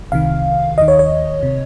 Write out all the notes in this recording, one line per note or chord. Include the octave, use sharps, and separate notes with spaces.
C2 C3 D#3 F5
D#2 D#3 D#5
C#5
C#5
C3